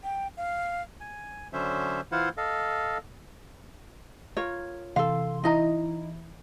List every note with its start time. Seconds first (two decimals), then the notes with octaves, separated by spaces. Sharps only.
0.04 G5
0.37 F5
1.00 G#5
1.53 D3 F#3 C#4 C5 E5
2.12 E3 E4 F4 C5 F5 F#5
2.37 A4 D#5 F5
4.37 F4 A#4 C#5
4.96 C3 E3 A4 F5 C6
5.44 E3 D#4 E4 D#5 A#5